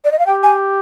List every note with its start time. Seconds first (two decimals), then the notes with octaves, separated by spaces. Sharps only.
0.05 D5
0.12 D#5
0.19 F5
0.26 G4 G5
0.43 G#5